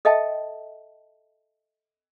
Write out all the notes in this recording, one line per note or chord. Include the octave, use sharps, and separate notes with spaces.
A4 D#5 E5 G5 A5